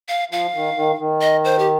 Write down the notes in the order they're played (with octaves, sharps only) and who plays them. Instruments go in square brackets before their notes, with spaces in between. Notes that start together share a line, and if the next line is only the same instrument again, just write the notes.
[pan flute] F5
[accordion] F3 [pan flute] F5
[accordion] D#3
D#3
D#3
[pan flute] D#5
C5
G4